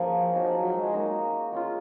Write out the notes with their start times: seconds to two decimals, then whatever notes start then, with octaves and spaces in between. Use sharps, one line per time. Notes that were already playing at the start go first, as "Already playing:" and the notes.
Already playing: F3 A#3 C#4 D#4 F#4 G#4 C#5
0.34 F3 D#4 F#4 C#5 F5
0.54 F#3
0.74 G#3
0.93 A#3 D#4 F#4
1.52 G#3 C#4 F4